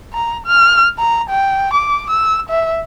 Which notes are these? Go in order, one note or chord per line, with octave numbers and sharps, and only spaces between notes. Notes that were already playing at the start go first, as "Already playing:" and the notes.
A#5
F6
A#5
G5
D6
E6
E5